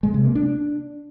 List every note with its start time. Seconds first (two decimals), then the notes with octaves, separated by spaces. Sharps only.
0.03 G#3
0.14 C3
0.25 A#3
0.35 D4